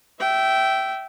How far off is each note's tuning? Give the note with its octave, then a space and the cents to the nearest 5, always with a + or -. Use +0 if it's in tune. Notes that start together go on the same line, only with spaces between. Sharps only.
E5 +0 G5 -20